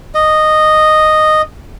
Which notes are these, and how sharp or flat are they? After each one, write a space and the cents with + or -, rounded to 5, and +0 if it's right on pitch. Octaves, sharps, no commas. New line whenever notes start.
D#5 -10